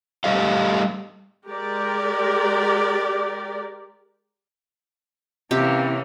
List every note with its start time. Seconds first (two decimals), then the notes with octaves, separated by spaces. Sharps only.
0.24 G3 A3 G4 D#5 F5
1.47 G#3 G4 A#4 D5
5.51 C3 E3 A#3 C#4 G4